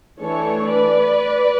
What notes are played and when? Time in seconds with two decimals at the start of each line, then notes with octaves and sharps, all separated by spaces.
0.19 E3 A3 D4 A4 C#5
0.68 B4 D5